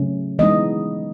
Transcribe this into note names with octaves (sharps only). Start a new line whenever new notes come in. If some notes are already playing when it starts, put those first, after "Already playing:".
Already playing: C#3 F#3 A3 C#4
E3 G#3 B3 D#4 D#5